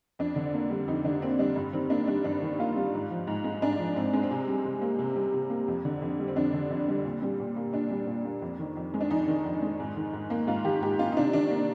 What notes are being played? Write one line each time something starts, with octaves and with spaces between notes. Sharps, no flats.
F2 D4
D3
A#3
G3
F2 D#4
D3 D4
A#3 C4
G3 D4
G2
D#3 C4
A#3 D4
G3 D4
G2 D4
D#3
A#3 F4
G3
G#2
F3
G#2
G#3
G#2 D4
F3
G#2 C4
G#3
C4
C3
G3
C3
A#3
C3
G3
C3
A#3
F2
D3
F2
G3
C4
F2 D4
D3
F2
G3
A#2
G3
A#2
A#3
A#2 D4
G3
A#2
A#3
F2
D#3
F2
G#3
D4
F2 D#4
D#3
F2
G#3
G#2
D#3
G#2
A#3
G#2 F4
D#3 G4
G#2 G4
A#3 F4
D#4
C3 D4
D#3 D4
A#3